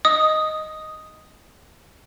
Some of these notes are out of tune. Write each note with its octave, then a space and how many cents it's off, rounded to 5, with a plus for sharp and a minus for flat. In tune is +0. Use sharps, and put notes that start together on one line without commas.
D#5 +0 D#6 +0